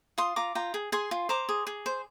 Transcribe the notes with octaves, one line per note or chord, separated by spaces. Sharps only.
F4 C6 D#6
F4 A#5 D6
F4 G5 A#5
G#4
G#4 G#5 C6
F4
C5 A#5 D6
G#4
G#4
C5